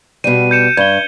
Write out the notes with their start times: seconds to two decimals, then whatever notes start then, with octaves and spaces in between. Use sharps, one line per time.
0.24 B2 G3 D#7
0.51 G6 C#7 E7
0.77 G2 G#6 G7